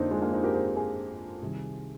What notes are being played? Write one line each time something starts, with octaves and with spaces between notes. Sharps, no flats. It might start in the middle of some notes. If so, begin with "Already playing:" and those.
Already playing: F2 D3 A#3 C4 D4 D#4
G#3 C4
A#3 D4
C4 D#4
G4 A#4
G#4 C5
G#4 C5
C2 C3 D#3